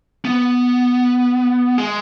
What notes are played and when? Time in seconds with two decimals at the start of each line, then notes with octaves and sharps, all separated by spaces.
0.25 B3
1.78 G#3